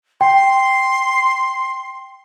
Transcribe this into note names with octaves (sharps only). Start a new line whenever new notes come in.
G5 C6